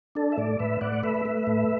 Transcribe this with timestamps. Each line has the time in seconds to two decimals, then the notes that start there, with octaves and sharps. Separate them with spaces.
0.15 D4 A4
0.32 E5
0.37 A2 A4 D5
0.59 A2 B4 E5
0.81 A2 D5 F#5
1.03 A3 B4 E5
1.25 A3
1.47 A2